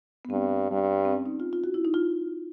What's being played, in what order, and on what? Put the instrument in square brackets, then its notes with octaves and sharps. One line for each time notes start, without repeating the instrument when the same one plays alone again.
[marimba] B3
[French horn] G2 [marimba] C4
[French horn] G2
[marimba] C4
C#4
D#4
F4
F4
F#4
E4
D#4
F4